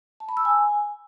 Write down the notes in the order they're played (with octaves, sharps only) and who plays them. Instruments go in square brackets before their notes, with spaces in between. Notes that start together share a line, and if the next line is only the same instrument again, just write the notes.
[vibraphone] A5
B5
E6
G#5